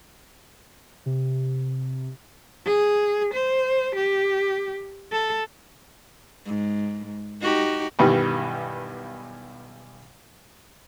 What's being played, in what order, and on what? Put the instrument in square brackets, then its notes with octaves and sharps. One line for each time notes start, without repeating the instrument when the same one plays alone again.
[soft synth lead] C3
[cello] G#4
C5
G4
A4
[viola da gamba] G#2
D#4 F#4 G4
[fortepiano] B1 G2 D#3 E3 G3